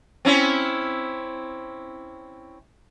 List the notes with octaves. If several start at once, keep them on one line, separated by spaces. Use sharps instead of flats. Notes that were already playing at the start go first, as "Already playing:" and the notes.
C4 C#4 E4